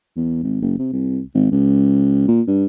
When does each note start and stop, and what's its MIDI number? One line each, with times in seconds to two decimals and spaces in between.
0.16 0.39 40
0.43 0.61 32
0.62 0.77 30
0.78 0.89 48
0.92 1.20 36
1.34 1.48 32
1.51 2.23 37
2.28 2.41 46
2.47 2.65 43